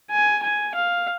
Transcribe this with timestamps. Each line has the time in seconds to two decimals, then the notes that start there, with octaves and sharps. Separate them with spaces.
0.11 G#5
0.43 G#5
0.75 F5